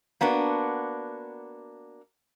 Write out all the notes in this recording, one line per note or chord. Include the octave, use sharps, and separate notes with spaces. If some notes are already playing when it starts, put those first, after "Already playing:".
A#3 B3 D4 F#4